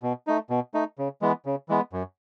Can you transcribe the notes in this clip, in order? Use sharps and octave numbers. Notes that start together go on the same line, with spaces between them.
B2
A3 D#4
B2
A3 D#4
C#3
E3 G#3 B3
C#3
E3 G#3 B3
F#2